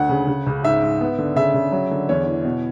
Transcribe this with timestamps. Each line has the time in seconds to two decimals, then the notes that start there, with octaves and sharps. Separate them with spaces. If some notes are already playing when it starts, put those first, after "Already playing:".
Already playing: D2 F#5
0.09 C#3
0.27 C#3
0.47 C#2
0.63 G#2 E5
0.83 G#2
1.01 B3
1.18 D3
1.36 C#3 E5
1.54 C#3
1.72 F#3
1.91 D3
2.09 E2 C#5
2.27 E3
2.44 B2